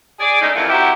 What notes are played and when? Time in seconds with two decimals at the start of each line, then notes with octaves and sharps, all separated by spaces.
0.20 G#4 D5
0.42 G#3 A3 C#4 D#4
0.55 F2 C3 D#3 E3 F4 F#5
0.69 C4 D#4 E4 F#4 G4